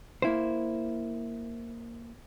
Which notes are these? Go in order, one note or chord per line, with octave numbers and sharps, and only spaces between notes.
A#3 E4 C5